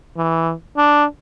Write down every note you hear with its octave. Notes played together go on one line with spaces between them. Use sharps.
E3
D4